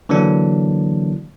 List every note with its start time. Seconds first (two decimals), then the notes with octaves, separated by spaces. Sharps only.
0.09 D3 E3 F#3 A#3 D4